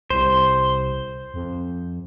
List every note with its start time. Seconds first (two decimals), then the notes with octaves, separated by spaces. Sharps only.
0.10 C2 C5
1.34 F2